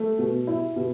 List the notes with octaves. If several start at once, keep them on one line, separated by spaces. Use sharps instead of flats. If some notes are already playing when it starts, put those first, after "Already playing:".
Already playing: A3
B2
E4
B2